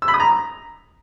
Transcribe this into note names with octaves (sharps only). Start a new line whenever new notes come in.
E6
B5
D#6
A#5